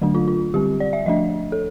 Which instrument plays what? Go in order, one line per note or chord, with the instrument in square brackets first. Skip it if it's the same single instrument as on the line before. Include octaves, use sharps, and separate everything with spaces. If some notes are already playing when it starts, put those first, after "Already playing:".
[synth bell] D3 F#3 A3 D4
F4
F4
D3 G3 C4 G4
D5
E5
F3 A3 D4 D#5
A4